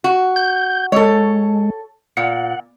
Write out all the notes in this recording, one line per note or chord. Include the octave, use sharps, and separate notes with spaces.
F#4
G6
G#3 A4 C#5
A#2 F#5